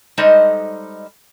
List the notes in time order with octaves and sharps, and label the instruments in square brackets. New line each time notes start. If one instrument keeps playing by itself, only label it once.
[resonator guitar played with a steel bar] G3 G#3 D#4 A4 C5 D#5